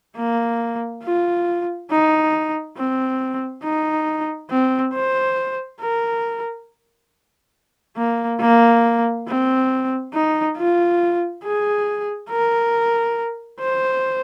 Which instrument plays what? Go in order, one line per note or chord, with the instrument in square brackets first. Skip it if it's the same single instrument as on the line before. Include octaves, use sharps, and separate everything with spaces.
[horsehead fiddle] A#3
F4
D#4
C4
D#4
C4
C5
A#4
A#3
A#3
C4
D#4
F4
G#4
A#4
C5